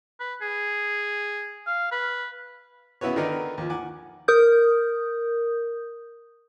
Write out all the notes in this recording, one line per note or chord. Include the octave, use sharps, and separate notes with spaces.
B4
G#4
F5
B4
C#3 B3 E4 F#4 B4 C#5
D3 D#3 D4 D#4 A#4 B4
D#2 F3
F#5 G#5 D6
A#4 D#6 G6